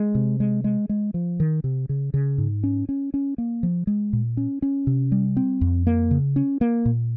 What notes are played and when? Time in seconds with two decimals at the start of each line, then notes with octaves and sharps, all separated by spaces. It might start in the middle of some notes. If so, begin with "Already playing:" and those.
Already playing: G#3
0.15 C3
0.40 G#3
0.64 G#3
0.89 G#3
1.14 F3
1.40 D#3
1.64 C3
1.89 C#3
2.14 C#3
2.38 G#2
2.64 C#4
2.89 C#4
3.14 C#4
3.38 A#3
3.63 F3
3.87 G#3
4.13 A#2
4.37 C#4
4.62 C#4
4.87 C3
5.12 G3
5.37 C4
5.61 F2
5.87 A#3
6.11 C#3
6.36 C#4
6.61 A#3
6.86 A#2